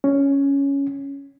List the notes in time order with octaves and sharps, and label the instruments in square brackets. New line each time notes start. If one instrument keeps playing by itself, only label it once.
[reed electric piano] C#4